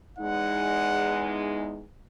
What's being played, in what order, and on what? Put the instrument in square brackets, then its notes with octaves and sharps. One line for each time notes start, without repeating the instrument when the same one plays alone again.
[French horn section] E2 G#3 D#4 [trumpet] F#5